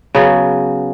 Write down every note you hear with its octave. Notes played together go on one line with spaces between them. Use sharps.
C#3 F#3 B3